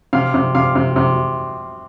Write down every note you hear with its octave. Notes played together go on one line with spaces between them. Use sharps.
C3 F5
C3
C3 F5
C3
C3